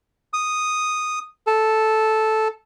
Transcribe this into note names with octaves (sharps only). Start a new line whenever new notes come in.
D#6
A4